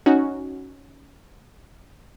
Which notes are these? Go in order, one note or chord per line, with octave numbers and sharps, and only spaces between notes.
C#4 D#4 F#4